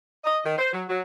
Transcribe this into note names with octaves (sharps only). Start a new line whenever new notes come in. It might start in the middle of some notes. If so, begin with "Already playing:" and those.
D#5
D#3
C5
F#3
F#3